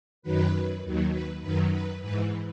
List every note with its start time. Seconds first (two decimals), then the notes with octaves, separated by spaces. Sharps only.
0.22 F#2 D#3 F#3 B4
0.83 D#2 D#3 F#3
1.12 B4
1.42 F#2 D#3 F#3 B4
1.71 B4
2.02 G#2 E3 B4